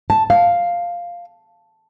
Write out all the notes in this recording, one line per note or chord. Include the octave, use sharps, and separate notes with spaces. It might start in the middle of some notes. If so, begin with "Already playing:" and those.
A5
F5